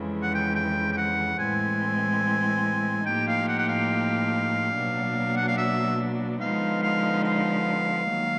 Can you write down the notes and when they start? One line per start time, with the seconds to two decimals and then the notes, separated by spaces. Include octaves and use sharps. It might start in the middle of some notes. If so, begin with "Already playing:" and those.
Already playing: F2 C#3 E3 G#3
0.23 F#5
0.35 G5
0.55 G5
0.92 G5
0.97 F#5
1.39 A2 E3 G#3 C4 G#5
3.06 A2 F3 A#3 D#4 G4 G5
3.28 F5
3.48 F#5
3.59 F#5
3.68 F5
4.73 B2 F#3 A#3 D4
5.37 F#5
5.48 F5
5.58 E5
6.41 D3 F3 G#3 B3 D#4 F5
6.83 F5
7.24 F5
8.08 D#3 F#3 A#3